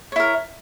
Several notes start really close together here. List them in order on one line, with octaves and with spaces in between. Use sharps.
C#5 E4 A#4